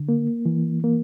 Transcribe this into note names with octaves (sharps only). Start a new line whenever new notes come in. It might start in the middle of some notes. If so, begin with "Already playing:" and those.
Already playing: D3
A#3
E3
A#3